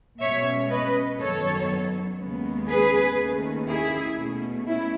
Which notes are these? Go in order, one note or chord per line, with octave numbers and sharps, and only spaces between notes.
B2 G#3 C#4 C#5 E5
B4 D#5
F#2 D#3 F#3 B3 A4 C#5
D#2 C#3 G#3 B3
G#4 B4
D#2 D#3 A3 C#4
E4 G#4
B2 A3 C#4
C#4 E4